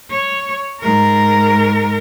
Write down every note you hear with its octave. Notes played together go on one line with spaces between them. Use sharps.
C#5
G#2 A#4